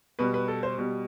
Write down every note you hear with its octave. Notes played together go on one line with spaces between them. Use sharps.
B2 G3 B4
B4
A4
C5
B2 G3